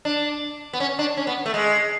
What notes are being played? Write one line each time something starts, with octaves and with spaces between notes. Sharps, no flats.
D4
B3
C#4
D4
C#4
B3
A3
G#3